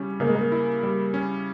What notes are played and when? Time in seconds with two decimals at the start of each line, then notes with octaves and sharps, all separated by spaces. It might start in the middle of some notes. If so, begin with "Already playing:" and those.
Already playing: C#3 G3 C#4 E4
0.20 C#3 A#3
0.27 G#3
0.35 A#3
0.52 E4
0.83 G3
1.14 C#4